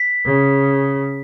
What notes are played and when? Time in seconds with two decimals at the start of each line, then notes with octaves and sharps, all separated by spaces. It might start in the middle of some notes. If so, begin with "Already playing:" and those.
Already playing: B6
0.26 C#3